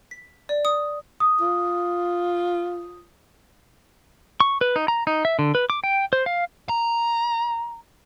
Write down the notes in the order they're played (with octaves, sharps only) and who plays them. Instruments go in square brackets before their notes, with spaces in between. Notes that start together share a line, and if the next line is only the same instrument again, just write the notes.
[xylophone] B6
D5
D#6
[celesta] D#6
[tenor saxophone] F4
[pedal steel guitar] C#6
B4
D#4
A#5
D#4
E5
D3
B4
D6
G5
C5
F5
[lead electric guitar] A#5